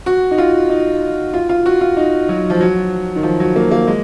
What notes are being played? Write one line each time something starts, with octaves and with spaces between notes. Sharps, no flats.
F#4
D#4
F4
D#4
F4
F4
F#4
F4
D#4
F#3
F3
F#3
D#3
F3
F#3
A#3
A#3
G#3